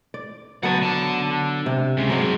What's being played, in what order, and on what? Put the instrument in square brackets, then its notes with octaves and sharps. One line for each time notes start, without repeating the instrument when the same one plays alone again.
[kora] D5
[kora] F#3 B3 F#4 [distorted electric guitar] F#5 A5
[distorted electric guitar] D3 A5
[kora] C3
[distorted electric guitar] C#3 G#3
[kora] F#3 D5 [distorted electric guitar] G#3 C4